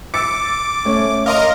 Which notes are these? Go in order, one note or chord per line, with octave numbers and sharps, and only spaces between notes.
D6 E6 A6 C#7
A3 C#4 C#5
A#4 D#5 F5 A#5 C6